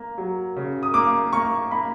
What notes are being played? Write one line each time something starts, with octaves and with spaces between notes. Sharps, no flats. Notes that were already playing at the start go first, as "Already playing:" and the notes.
Already playing: A#3
F#3
C#3
D#6
A#3 D6
A#3 C#6
A#3 B5